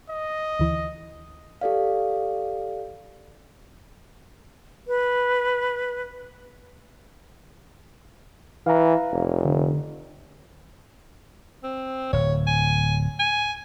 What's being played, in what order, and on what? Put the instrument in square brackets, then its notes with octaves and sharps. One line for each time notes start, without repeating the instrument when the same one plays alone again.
[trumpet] D#5
[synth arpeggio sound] D2 E3
[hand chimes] G4 A4 D5 F5
[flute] B4
[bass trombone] E3 [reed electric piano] F5 A#5
[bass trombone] F1
[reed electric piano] D3
[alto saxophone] C4
[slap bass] D1 [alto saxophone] C#5
[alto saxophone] G#5
G#5